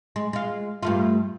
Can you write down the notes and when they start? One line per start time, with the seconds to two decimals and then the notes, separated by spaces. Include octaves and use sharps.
0.16 G#3
0.33 G#3 F4
0.83 G2 A3 F4